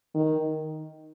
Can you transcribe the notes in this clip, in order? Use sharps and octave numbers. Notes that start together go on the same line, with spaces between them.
D#3